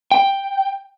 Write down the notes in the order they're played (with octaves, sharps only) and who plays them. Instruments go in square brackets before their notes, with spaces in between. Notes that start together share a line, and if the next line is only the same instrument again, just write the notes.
[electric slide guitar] G5